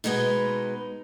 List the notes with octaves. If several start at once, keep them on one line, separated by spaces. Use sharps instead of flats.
B2 G#3 B3 D#4